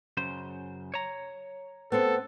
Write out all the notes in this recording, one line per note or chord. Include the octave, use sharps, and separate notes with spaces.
F#2 C#3 C5
C#5 A#5
B3 C4 A4